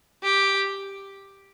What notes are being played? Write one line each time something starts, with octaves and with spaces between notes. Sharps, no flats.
G4